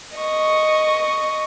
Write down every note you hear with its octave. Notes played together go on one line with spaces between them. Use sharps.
D#5 C#6